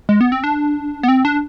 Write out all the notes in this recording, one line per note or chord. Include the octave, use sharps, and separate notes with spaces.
G#3
B3
C4
D4
B3
C4
D4